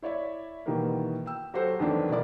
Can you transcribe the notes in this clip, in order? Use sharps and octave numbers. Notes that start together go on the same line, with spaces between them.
E4 C#5 D5 E5
B2 D#3 E3 G3 A#3
G5 E6
F#3 F#4 G4 A4 C5
F2 D#3 E3 F#3 A3 D4
B2 E4 A#4 D5 D6